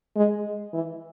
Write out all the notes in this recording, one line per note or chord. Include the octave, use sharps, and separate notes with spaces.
G#3
E3